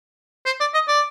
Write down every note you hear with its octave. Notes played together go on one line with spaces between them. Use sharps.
C5
D5
D#5
D5